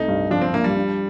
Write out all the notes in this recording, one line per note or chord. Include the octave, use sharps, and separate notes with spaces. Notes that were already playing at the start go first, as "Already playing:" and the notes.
Already playing: C2 A3 D#4
G2
F3 D4
C4
A#3 D4
G3
D4